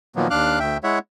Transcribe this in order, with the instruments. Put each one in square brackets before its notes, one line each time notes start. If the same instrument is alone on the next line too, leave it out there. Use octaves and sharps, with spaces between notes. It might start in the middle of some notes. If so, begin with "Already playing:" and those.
[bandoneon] A#2 D#3 F3 F#3 A#3 B3
D#2 D4 F5 D6 F6 F#6
D2 E5 G5
G#3 E4 C#5 E5 F#5